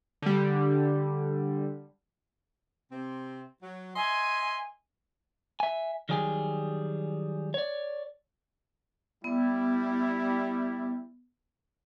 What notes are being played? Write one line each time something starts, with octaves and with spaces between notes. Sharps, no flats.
D3 G3
C3 C4
F#3
D#5 E5 G#5 C6
E5 G#5
D#3 F#3 G3 G#4 G5 G#5
C#5 D5
G3 B3 E4